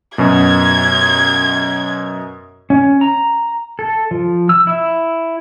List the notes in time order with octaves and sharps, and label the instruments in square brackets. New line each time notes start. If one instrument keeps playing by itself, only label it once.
[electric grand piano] F#2 B2 [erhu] G#6
[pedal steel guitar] C#4
A#5
A4
F3
E6
E4